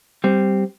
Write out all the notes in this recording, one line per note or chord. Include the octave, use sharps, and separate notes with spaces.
G3 C4